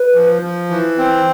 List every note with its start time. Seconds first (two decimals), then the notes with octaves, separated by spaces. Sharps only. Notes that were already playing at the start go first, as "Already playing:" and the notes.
Already playing: B4
0.15 F3
0.42 F3
0.70 E3
0.98 C4